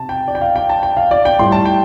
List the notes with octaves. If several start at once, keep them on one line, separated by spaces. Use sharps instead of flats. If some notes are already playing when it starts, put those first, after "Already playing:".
Already playing: C3 A5
G5
D5
G5
F5
G5
A5
G5
F5
D5
G5
A2 G3 C6
A5
G5